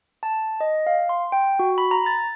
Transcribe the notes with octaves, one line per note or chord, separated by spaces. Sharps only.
A5
D#5
F5
C6
G5
F#4
B5
A#5
A6